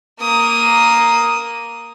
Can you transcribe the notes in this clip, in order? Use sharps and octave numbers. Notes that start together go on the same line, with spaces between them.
A#3 D#6